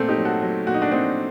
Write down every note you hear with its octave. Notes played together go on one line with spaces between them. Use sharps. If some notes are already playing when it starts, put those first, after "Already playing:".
Already playing: A#2 A3 C4
D#4 G4
F#3
F#4 A4
F#3
A#2 F#4
D#4
D4 F#4
A#2 C4 D#4